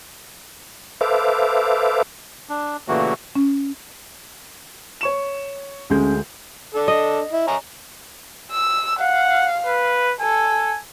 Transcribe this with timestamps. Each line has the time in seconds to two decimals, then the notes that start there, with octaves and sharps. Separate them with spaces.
1.01 A4 B4 C5 E5 F5 D6
2.49 D4
2.88 A#2 C#3 E3 A3 A#3 F#4
3.36 C#4
5.01 C#5 C#6 E7
5.90 D2 G#3 C#4 G6
6.75 D4 A4
6.88 D#5
7.32 E4
7.47 C#5 G#5 A#5
8.51 E6
8.99 F5 F#5
9.66 B4
10.21 A4 G#5